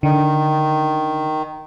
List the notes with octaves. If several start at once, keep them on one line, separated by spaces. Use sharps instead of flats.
D3 D#3